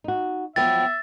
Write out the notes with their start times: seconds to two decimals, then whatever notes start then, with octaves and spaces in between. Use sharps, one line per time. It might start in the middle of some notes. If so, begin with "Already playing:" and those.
0.04 D#4 F#4
0.56 F3 F#3 B3 E5 G5 A6